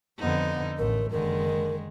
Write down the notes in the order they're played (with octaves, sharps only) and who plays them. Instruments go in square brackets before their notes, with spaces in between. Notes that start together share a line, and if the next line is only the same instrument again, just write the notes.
[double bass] F2 B3 [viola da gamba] D3 D#4
[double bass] A1 [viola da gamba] A3 [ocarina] A#4
[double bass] F#1 D3 [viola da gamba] D#3 G#3 [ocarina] A#4